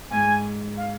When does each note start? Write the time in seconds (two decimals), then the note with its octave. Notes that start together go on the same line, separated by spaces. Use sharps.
0.11 G#2 G#5
0.77 F5